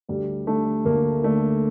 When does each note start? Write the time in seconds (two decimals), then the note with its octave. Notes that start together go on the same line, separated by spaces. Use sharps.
0.09 D2 G3
0.47 D3 A3
0.85 D2 A#3
1.23 D3 A3